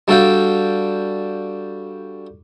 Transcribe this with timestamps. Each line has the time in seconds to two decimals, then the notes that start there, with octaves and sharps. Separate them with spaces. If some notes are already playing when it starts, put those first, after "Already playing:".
0.08 G3 D4 F#4 A4 F5 G5